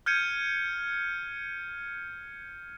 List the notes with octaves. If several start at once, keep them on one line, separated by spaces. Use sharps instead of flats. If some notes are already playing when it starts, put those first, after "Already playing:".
F6 G6 G#6 C#7 D#7